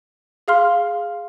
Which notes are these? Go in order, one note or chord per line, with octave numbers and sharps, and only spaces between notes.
G#4 F5 C6 F6